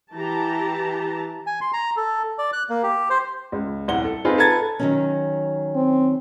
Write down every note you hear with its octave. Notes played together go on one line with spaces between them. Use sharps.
E3 G4 A5 A#5
G#5
C6
A#5
A4
D5
F#6
A#3
G4
C5
C#2
D#1 C2 F#5 G7
A4
C4 D#4 F4 G#4 B4
A4 B4 A5 A#5 G#6 A6
D#3 F#3 C#4
C4